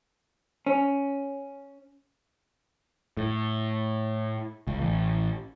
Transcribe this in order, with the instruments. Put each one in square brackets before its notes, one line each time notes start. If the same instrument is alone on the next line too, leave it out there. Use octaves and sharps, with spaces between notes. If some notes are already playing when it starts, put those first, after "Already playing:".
[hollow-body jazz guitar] C#4
[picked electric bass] A2
C#2
A1